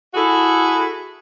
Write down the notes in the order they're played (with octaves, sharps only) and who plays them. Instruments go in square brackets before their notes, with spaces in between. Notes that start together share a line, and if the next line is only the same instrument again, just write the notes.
[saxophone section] E4 F#4 G#4 A4